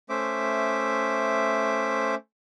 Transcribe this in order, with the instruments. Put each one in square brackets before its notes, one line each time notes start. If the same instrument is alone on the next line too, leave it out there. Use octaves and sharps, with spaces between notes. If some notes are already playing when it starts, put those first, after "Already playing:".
[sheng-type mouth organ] A3 C#4 C5 E5 D6